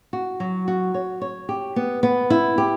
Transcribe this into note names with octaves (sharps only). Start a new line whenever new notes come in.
F#4
F#3
F#4
C#5
C#5
G4
B3
B3
E4
G4